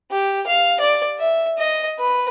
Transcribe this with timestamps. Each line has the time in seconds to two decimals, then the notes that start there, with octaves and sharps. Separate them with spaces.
0.11 G4
0.47 F5
0.80 D5
1.19 E5
1.58 D#5
1.98 B4